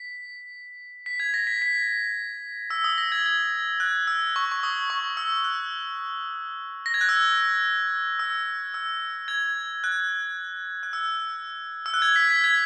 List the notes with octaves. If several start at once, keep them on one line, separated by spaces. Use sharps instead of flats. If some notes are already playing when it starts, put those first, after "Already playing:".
Already playing: B6
B6
G#6
A#6
B6
B6
E6
D#6
A#6
G#6
G#6
F#6
E6
C#6
C#6
D#6
C#6
E6
F#6
A#6
G#6
F#6
E6
E6
E6
G#6
F#6
F#6
E6
E6
F#6
G#6
B6
B6
G#6